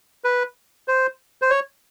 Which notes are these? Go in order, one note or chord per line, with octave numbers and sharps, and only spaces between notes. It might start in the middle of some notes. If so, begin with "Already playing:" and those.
B4
C5
C5
C#5